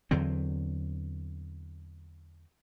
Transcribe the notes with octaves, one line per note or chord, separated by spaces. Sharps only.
E2 D3 F#3 C4